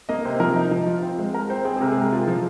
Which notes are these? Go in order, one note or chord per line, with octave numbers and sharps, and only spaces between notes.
A#3 D#5
C3 C5
F3 A#4
D#4
F3
F4
C4
G#3
G#3 A#4
C4 C5
C4 G#4
G#4
C3 A#4
G#4
G#3 A#4
F4
F3